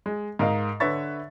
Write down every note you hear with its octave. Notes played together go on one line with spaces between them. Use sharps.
G#3
G#2 A#4 D#5 F5
D3 B4 C#5 E5 C#6 A6